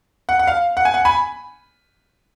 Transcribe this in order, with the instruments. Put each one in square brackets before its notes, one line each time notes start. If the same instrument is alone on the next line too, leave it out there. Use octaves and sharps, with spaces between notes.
[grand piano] F#5
F#5
F5
F#5
G#5
F#5
G#5 B5